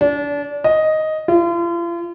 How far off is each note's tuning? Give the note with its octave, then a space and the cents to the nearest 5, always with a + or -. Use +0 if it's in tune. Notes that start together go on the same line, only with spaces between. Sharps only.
D4 -30
D#5 +5
F4 -40